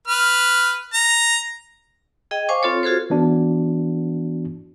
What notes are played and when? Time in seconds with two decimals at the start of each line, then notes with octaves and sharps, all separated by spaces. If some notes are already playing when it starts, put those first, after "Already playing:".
0.07 B4 F6
0.93 A#5
2.31 G#4 D#5 G5
2.49 C5 F5 G#5 C#6 D6
2.63 C4 F4 A4 C#5
2.83 F4 F#4 G#4 A4 C5
3.10 E3 B3 D4 F#4